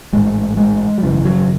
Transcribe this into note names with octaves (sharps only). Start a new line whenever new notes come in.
A1 G#2 G#3
G#3
F#3
G#1 F#2 C#3 E3
F#3